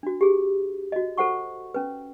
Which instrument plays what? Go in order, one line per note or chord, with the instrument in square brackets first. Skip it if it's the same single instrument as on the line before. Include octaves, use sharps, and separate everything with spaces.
[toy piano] D4 F#4
G4 G#4
F#4 D#5
A4 C5 F#5 C#6
C#4 B4